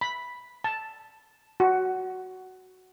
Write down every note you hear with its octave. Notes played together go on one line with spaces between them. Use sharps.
B5
A5
F#4